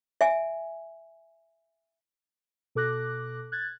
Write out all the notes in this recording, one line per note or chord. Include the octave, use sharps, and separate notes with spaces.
E5 G#5
B2 A4 D6 F#6 A#6
F#6 G#6 A6